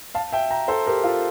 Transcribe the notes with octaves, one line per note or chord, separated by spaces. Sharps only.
F5 A5
E5 G5
G5 A#5
A4 C5
G4 A#4
F4 A4